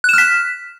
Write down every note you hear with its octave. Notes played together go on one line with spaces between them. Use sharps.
F6 F#6 B6 E7